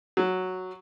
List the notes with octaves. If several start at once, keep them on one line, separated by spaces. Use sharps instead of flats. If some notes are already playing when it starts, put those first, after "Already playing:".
F#3